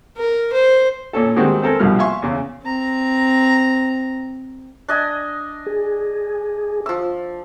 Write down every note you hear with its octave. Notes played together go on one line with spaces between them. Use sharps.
A#4
C5
A#2 C#4 A4
G#2 D#3 G3 G#3 C4 F#4
C4 A4 A#4 G#5
C2 G2 B2 F3 F6
E5 F5 G#5 C6 C#6
E2 C#3
C4 A#5
D4 D#5 G#5
G#4
F3 E6